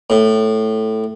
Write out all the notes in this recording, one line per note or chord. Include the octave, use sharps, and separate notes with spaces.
A2